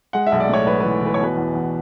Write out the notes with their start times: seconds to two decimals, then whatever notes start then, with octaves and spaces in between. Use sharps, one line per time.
0.13 G#3 F#5
0.27 E5
0.32 B1
0.40 D5
0.49 A2 C#5
0.66 B1 B4
0.80 E3 B4
1.02 E3 B4
1.14 C#5
1.19 B2 B4
1.37 E2
1.54 E2